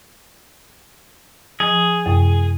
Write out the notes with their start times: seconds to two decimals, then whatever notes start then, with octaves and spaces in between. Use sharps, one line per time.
1.60 F3 G#4
2.06 F#2 C3